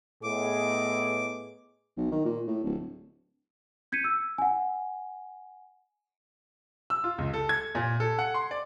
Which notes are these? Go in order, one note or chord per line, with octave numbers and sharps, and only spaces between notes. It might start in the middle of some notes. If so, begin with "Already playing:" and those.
A2 B3 G#4 D#5 D6
B1
D#3
A#2
A2
D1
G6 G#6 B6 C#7 D#7
E6
F#5 G#5
E6
F4
C#2
A4
G#6
A#2
A4
F#5
C6
D5